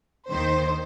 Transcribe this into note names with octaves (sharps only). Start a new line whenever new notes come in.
D#2 D#3 C5